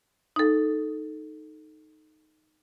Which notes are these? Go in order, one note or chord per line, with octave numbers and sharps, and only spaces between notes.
D#4 A4